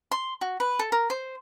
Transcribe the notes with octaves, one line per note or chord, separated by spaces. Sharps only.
C6
F#4
B4
A4
A#4
C5